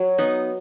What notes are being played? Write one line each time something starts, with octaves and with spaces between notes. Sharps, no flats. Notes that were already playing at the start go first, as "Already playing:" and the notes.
Already playing: F#3
B3 D#4